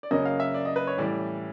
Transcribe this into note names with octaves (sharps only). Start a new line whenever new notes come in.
D5
F#2 C#3 F#3 A#3 D#5
F5
E5
D5
D#5
B4
C#5
A2 E3 G3 D5